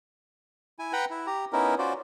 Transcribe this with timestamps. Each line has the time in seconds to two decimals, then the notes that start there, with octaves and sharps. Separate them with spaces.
0.79 E4 G#5
0.93 B4 F#5 G5 A#5 B5
1.10 E4
1.27 G4 A#5
1.53 B3 C#4 D#4 E4 A#4
1.79 C#4 F4 F#4 C5 D5